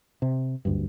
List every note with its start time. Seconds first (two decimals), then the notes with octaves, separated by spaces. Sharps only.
0.22 C3
0.65 F#1 D2 G2